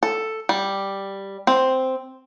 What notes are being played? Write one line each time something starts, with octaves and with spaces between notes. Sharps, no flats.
A4
G3
C4